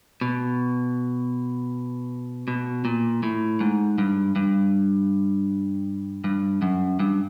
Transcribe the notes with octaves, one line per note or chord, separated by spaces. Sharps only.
B2
B2
A#2
A2
G#2
G2
G2
G2
F#2
G2